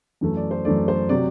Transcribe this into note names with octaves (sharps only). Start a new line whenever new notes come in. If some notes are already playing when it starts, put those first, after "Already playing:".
F#2 E3 A3
D5
C5
F#2 E3 A3 D5
C5
C3 F#3 D5